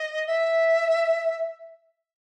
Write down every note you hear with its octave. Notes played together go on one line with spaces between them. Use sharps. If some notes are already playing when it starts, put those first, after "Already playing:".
Already playing: D#5
E5